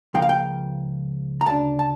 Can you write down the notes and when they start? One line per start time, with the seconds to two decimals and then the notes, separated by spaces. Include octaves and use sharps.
0.14 C#2 C#3 F3 A#3 G5
0.22 F5
0.29 G5
1.41 A#5
1.46 D2 C#3 D4 A5
1.79 A5